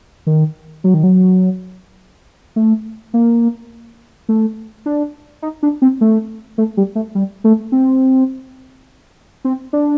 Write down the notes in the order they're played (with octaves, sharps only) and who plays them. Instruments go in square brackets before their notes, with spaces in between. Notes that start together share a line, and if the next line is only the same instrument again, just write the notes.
[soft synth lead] D#3
F#3
D#3
F#3
A3
A#3
A3
D4
D#4
D4
C4
A3
A3
G3
A3
G3
A3
C4
C4
D4